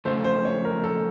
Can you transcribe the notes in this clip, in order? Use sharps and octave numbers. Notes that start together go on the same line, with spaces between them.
F2 C#3 F3 A3 C5
C5
C#5
A#4
A4